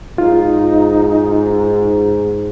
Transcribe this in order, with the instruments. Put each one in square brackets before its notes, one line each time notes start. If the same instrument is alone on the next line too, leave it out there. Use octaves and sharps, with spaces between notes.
[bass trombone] G#2 [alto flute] D#4 [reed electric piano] F4